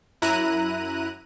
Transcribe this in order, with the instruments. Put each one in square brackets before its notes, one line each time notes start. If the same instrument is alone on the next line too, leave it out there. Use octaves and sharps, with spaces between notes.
[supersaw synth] F#2 E4 A#5 F#6 D#7